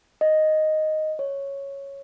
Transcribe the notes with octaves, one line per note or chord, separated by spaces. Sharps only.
D#5
C#5